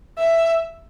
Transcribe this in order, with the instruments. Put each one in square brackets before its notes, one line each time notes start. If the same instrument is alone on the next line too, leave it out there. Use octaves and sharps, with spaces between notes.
[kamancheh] E5